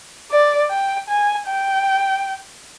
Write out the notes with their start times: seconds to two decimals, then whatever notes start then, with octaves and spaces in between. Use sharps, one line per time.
0.31 D5
0.70 G5
1.09 G#5
1.47 G5